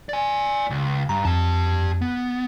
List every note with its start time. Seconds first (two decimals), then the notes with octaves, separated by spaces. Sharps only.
0.09 D5 G#5
0.70 C#2
1.09 G2 A#5
1.25 F2 G4 A5
2.02 B3